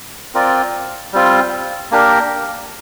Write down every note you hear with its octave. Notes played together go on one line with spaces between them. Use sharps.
C4 F4 A#4 D5
G3 C4 F4
A#3 D4 G4 A#4